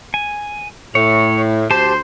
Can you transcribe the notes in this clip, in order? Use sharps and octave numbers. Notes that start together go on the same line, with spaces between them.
G#5
A2 C#5
D2 G4 C5 A5